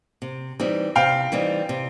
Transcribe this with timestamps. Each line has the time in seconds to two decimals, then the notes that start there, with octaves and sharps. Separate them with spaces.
0.22 C3
0.60 E3 G3 C4 D#4
0.95 C3 F5 G5
1.32 E3 G3 C4 D#4
1.69 C3